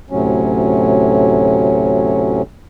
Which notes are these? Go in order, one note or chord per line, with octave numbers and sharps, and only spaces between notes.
D2 A2 C3 F#3 C#4